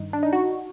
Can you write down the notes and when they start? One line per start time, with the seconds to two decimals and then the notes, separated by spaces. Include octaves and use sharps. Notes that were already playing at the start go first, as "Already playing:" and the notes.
Already playing: G2 D#3 D#4
0.13 D4
0.23 D#4
0.33 F#4